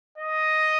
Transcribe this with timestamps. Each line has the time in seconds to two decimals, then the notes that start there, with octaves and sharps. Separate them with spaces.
0.18 D#5